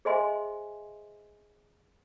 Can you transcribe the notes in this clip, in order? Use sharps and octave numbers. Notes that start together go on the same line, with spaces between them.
G#4 C5 D#5 E5 G#5 C6